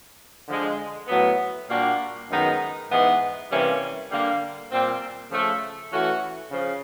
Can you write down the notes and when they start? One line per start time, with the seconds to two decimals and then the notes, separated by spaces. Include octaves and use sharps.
0.48 D3 F3 G#3
1.08 A2 F#3 B3
1.69 A#2 G3 A#3 D4 F#4
2.29 F#2 D#3 G#3 B3 D#4
2.89 G#2 E3 G#3 B3
3.49 C3 E3 G3 A#3 C#4
4.10 D3 G3 A#3
4.71 A#2 G3 C4
5.30 C#3 F3 A3
5.91 E3 A3 C#4 F#4
6.51 C#3 F3